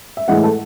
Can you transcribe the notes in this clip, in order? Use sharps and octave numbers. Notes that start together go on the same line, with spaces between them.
E5
A2 E3 G#3 F#5
A4